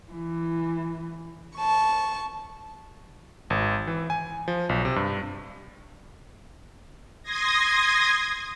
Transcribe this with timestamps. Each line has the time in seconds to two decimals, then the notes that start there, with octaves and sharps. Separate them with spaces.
0.13 E3
1.56 A5 C#6
3.50 G#1
3.87 E3
4.10 G#5
4.48 F3
4.69 B1
4.85 C3
4.96 G2
7.23 C6 D#6 G#6 A#6